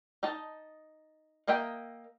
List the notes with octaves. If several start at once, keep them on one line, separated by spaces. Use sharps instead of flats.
D#4 D#5 A5
A#3 A#4 D#5 E5 G5